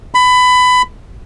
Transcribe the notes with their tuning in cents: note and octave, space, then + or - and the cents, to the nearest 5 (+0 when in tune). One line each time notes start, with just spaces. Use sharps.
B5 +20